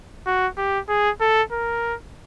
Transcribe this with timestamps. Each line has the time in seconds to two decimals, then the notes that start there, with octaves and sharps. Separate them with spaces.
0.26 F#4
0.58 G4
0.89 G#4
1.21 A4
1.52 A#4